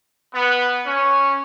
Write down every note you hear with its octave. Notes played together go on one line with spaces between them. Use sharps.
B3
C#4